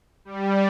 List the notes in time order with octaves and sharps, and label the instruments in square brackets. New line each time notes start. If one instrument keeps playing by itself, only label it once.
[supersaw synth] G3